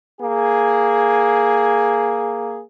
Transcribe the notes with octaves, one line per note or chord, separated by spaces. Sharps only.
A#3 G#4